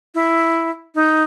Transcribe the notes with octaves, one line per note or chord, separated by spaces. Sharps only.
E4
D#4